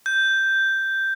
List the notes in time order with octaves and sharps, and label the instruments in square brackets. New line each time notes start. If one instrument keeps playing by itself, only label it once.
[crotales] G6